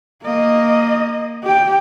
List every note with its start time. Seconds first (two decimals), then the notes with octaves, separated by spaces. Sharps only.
0.23 A#3 D#5
1.43 G4 G5